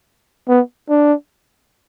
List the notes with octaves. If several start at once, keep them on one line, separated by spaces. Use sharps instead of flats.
B3
D4